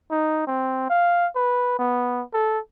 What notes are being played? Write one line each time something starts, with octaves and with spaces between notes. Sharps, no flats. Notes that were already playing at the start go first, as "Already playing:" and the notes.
D#4
C4
F5
B4
B3
A4